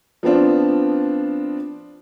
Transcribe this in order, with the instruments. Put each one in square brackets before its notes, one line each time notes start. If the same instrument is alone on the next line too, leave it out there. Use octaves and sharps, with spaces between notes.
[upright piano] F3 B3 C4 D4 F4